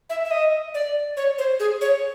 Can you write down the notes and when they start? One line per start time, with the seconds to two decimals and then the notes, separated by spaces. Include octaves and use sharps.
0.10 E5
0.25 E5
0.31 D#5
0.74 D5
1.17 C#5
1.38 C5
1.60 G#4
1.81 C#5